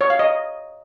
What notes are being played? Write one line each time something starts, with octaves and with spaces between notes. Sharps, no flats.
C#5
F5
D#5